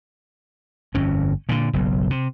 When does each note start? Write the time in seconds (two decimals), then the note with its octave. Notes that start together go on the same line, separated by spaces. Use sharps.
0.94 G1 F2 C#4
1.49 A#2 D3
1.73 F#1 B1
2.10 C3